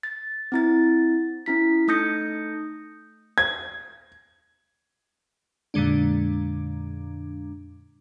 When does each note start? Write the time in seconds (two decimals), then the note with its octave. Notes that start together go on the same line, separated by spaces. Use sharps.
0.03 A6
0.52 C4 E4 A6
1.46 C#4 E4 B6
1.88 A3 D#4 D#6 G6 A#6 C#7
3.38 G#6
5.74 F2 A#2 D3 G#3 D4